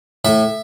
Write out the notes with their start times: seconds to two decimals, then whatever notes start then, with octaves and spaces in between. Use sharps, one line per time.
0.25 A2 E5